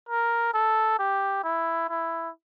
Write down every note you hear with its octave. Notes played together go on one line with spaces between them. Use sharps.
A#4
A4
G4
E4
E4